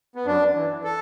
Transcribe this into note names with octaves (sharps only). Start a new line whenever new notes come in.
B3
F#2 D4
E3
A4